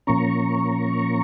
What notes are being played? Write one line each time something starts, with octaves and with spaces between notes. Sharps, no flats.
A#2 F3 A#3 C#4 A#5 C#6